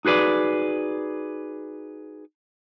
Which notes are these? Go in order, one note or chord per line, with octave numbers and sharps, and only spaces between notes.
D#4 F#4 G#4 B4 D5